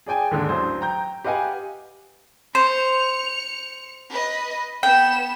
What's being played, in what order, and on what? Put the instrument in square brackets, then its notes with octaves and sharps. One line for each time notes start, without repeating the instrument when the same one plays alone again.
[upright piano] G#4 D5 G5 G#5
D#2 G#2 D3 G#3 D4
A1 F#3 C5
G5 A#5 G6
G4 B4 D#5 F5 F#5 G#5
[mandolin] C5 [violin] C#7 F7
[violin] B4 D#5
[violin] B3 E7 [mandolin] G5